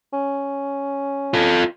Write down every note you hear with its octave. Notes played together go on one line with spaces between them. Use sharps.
C#4
F4 A4